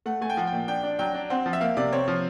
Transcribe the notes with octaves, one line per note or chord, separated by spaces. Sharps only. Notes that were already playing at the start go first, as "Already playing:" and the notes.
A3 F#5
A3 G#5
G5
F3 F#5
G5
A#2
D4 G5
D4
F#3 G5
D4
C4 F#5
F3
E5
A#3 F5
C3 D5
C4 C#5
F3